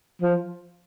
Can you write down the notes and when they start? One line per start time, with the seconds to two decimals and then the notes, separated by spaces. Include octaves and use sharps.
0.22 F3